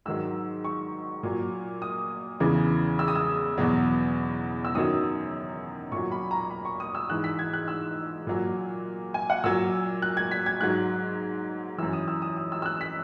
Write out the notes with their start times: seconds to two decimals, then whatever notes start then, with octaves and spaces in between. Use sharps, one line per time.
0.06 G#2 D#3 F#3 E6
0.64 C#6
1.23 A#2 F#3
1.82 D#6
2.40 E2 C#3 E3
2.99 E6
3.08 D#6
3.15 E6
3.58 E2 B2 F#3
4.65 E6
4.75 F#2 D#3 F#3 D#6
5.92 A#2 F#3 C#6
6.12 B5
6.31 A#5
6.50 B5
6.65 C#6
6.80 D#6
6.95 E6
7.09 G#2 E3 F#6
7.24 B6
7.39 G#6
7.53 F#6
7.68 E6
8.27 A#2 F#3
9.14 G#5
9.30 F#5
9.44 A#2 F#3 E6
10.02 F#6
10.17 G#6
10.31 B6
10.46 G#6
10.61 G#2 F#3 F#6
11.78 F#2 E3 E6
11.93 D#6
12.08 E6
12.22 D#6
12.37 D#6
12.52 E6
12.62 E6
12.66 F#6
12.81 B6